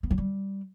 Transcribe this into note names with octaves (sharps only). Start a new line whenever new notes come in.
B3
F#3
G3